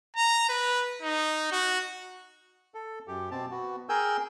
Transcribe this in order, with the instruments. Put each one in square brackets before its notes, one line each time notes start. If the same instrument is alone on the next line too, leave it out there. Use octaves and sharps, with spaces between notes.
[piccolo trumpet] A#5
B4
D#4
F#4
[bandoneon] A4
F#2 G4
B2 C4 A5
B3 F#4
G#4 A#4 G5 G#5 E6 G6